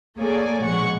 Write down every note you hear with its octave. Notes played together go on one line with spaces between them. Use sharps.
A#3 G#4 A4 C#5 D5 G#5
A#1 B2 G#3 F#5 C#6